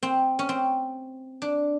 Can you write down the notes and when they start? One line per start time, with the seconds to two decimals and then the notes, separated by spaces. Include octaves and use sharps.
0.03 C4
0.39 C#4
0.49 C4
1.42 D4